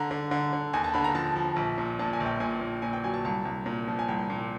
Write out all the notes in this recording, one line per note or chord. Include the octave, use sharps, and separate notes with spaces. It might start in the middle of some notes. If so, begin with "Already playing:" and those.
Already playing: D3 A#5
D3
D3
D3
D#2 G#5
A5
D3 B5
A#5
F3 A5
F3
A#1
A#2
A#2 A5
G#5
A#1
G5
A#2 G#5
A#2
A#2 G#5
G5
F#3 G#5
A5
C2 A5
C2
A#2
F3
G#5
C2 G5
A#2